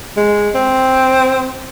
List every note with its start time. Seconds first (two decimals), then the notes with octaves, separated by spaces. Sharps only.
0.17 G#3
0.55 C4